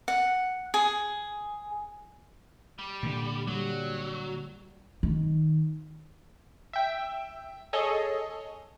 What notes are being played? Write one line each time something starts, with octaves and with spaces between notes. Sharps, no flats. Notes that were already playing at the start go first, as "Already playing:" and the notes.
F#5
G#4
G3
A#2 D3
F#3 G3
D#3
E5 G5
G#4 A4 C#5 D#5